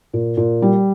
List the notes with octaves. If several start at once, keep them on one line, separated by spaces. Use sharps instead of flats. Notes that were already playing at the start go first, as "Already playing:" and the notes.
A#2
A#2
G3